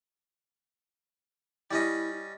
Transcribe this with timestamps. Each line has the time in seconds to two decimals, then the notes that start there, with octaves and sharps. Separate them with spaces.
1.71 G3 C#4 E4 D#5